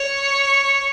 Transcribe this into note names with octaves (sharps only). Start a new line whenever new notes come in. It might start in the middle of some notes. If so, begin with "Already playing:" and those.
Already playing: C#5